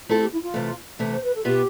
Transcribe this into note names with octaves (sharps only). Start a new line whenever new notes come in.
A3 C4 E4 F4 A4
G4
E4
F4
C3 E3 A3
C3 E3 A3
C5
B4
A4
B2 B3 F4 G4 B4 E5